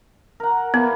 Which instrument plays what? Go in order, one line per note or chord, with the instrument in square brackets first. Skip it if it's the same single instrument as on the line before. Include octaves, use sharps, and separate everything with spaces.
[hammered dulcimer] A#4 F#5
[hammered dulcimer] E3 A#3 B4 [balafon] B3